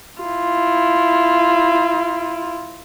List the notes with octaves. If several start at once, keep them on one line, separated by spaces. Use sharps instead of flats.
E4 F4